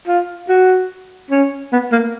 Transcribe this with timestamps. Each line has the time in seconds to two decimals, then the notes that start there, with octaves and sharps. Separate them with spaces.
0.08 F4
0.49 F#4
1.30 C#4
1.72 B3
1.92 A#3